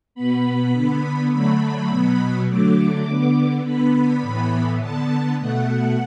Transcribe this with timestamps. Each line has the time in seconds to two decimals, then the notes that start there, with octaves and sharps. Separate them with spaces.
0.15 B2 B3 B5
0.73 D3 B3
1.31 D3 F#3 A3 B5
1.89 B2 F#3 B3
2.47 D3 F#3 A3 D6
3.06 D3 B3
3.63 D3 B3 B5
4.21 A2 E3 B3
4.80 D3 B3 A5
5.37 B2 A3 F#5